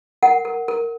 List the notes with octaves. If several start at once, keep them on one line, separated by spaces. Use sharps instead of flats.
A#4 F#5
A#4
A#4